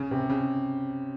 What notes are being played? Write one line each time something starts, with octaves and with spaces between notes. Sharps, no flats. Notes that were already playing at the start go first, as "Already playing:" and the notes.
Already playing: C#3
C3
C#3